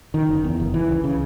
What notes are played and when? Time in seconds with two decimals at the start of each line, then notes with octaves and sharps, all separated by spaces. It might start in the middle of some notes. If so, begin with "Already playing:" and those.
0.14 D#3
0.29 F#1
0.44 E2
0.60 F#1
0.74 E3
0.89 C#2
1.04 C#3